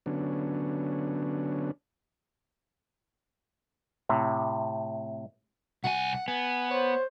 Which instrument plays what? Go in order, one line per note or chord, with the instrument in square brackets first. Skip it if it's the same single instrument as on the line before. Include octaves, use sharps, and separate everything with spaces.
[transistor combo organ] D3 F#3 B3 C#4 D4
[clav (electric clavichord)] A2 C3
[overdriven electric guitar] C2 G#5 [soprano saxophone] F#5
[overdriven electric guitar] B3 [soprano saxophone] G#5
[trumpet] C5 [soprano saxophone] C#5